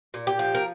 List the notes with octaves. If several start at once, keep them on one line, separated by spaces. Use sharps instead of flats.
A#2
G4
F3
A#4